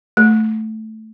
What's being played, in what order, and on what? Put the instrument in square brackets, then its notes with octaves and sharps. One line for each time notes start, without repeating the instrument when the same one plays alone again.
[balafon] A3